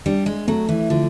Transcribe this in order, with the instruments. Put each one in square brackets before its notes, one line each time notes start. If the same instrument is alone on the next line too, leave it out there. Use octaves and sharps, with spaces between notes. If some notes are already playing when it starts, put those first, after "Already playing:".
[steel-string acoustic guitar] G3 [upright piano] D4
[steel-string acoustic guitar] G#3
[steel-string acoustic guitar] F#3 [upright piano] A3
[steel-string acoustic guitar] E3
[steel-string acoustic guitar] D3 [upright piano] F3